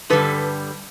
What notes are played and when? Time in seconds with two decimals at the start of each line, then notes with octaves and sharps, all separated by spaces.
0.10 G2 D3 G3 A4 B4